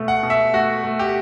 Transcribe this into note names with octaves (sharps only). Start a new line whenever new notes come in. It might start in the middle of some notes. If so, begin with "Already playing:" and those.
Already playing: B2 A3
F#5
B2
E5
A3 F#4
A3
G4